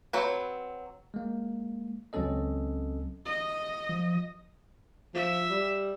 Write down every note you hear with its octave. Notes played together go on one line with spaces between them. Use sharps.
F#3 C4 B4
G#3 A#3
C#2 F#3 C4 C#4 A4 D#5
D#5
F3
F3 E5
G3